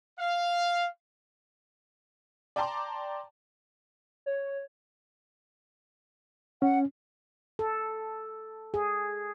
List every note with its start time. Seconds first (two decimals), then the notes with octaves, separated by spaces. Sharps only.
0.19 F5
2.56 D5 G5 A5 A#5 C6 D6
4.26 C#5
6.62 C#4 F#5
7.59 A4
8.74 G#4